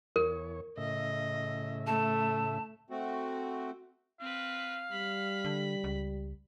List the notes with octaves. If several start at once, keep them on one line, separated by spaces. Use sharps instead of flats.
E2 A#4 C#5
A2 C#3 D#5 E5
A3 A5
A3 C4 F#4
C4 B4 F5
G3 B5
D3
C#2